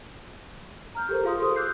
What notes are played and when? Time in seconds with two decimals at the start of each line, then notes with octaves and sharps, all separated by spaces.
0.95 A#5 F6 G6
1.09 G4 A4 A#4 C5
1.24 F4 G#4 F5 C6 D#6
1.38 G4 A4 C5 D#6
1.56 D6 E6 F#6 G6 C7